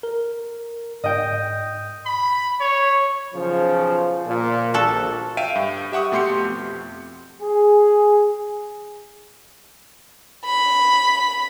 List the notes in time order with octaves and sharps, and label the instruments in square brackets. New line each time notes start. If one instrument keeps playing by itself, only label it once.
[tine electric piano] A#4
[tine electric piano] G#2 [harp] D#5 G5
[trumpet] B5
C#5
[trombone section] B1 C#3 F3
A#2
[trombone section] A#1 [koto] F#4 A4
[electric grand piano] E5 F5 G5 D7 D#7
G2
G4 E5 F#5 C#6 D#6
B2 A3 G4 C6 G6 C#7
F2
[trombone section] G#4
[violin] B5